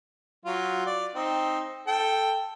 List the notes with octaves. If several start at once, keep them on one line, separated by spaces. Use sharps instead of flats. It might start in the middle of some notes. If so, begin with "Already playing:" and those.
F#3 F4
D5
C4 D#4
A4 G5